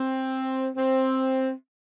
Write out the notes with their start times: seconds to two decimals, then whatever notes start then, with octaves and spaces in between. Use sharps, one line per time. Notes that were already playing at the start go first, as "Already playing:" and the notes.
Already playing: C4
0.76 C4